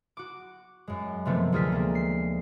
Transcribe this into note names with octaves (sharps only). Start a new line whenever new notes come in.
F#4 D6
F#2 G#3
C3 D#3 F3 A3 B3 C4
D2 F4 G#4 A4 F6 B6
G#3 A#3 D4
C7